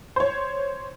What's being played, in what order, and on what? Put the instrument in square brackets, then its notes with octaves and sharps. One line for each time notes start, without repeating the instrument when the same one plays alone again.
[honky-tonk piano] C5 C#5